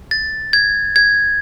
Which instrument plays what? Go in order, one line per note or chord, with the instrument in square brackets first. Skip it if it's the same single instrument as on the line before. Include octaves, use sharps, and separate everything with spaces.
[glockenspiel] A6
G#6
G#6